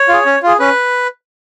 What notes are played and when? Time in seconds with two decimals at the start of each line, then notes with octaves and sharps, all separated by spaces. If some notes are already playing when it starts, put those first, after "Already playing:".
Already playing: C#5
0.08 F4 G#4
0.26 C#4
0.43 F4 G#4
0.60 C#4 B4